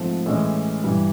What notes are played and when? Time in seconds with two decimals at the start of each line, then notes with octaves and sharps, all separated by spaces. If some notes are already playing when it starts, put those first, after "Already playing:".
Already playing: G#2 F3 A3 C4
0.26 A2 E3 G#3 C#4
0.83 G2 E3 G3